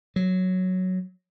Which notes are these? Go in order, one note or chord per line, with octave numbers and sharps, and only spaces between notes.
F#3